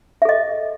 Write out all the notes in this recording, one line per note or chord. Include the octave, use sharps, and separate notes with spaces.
A4 D#5 E5